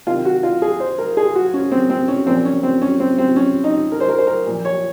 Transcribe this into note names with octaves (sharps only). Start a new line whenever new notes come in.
C3 D#3 F4
F#4
F4
G#4
C5
A#4
G#4
F#4
C#4
C4
C4
C#4
A#2 F3 C4
C#4
C4
C#4
C4
C4
C#4
D#4
A#4
C5
A#4
C5
A#4
A#2 F3
C#5